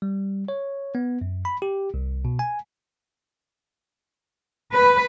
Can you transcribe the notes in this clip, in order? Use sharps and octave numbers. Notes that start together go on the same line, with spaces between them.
G3
C#5
B3
F#2
B5
G4
C2
B2
G#5
B4